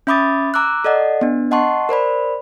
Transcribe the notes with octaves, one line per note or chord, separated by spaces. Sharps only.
C#4 E5 B5 D6 D#6 A6
A#5 D6 E6 F#6
A4 D5 D#5 F#5
B3 D4
D#5 F#5 A5 C6 C#6
A#4 C5 D5 B5